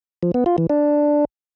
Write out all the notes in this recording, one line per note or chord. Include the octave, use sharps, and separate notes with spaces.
F3
B3
F4
E3
D4